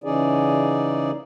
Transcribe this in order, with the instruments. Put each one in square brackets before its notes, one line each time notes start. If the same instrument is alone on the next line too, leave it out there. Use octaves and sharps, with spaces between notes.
[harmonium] C#3 E3 C#4 D#4 G#4 D5